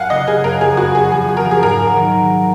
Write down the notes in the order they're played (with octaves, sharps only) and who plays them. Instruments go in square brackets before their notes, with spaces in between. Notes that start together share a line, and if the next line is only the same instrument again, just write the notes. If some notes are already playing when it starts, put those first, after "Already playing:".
Already playing: [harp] F#2 [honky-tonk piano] F5 F#5 G#5
[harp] C#3 [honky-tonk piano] D#5
[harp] C#3 [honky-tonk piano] G#4
[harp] F#2 [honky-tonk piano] A#4
[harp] F2 [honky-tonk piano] G#4
[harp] B3 [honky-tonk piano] F#4
[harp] B3 [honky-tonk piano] G#4
[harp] F3 [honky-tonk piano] G#4
[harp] F3
[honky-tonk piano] A#4
[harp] F3
[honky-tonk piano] G#4
[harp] G#2 [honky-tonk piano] A#4
[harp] F#3
D#3